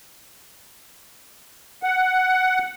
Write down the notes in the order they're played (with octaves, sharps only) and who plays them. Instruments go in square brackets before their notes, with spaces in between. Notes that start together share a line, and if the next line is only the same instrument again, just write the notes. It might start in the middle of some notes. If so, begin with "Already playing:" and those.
[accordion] F#5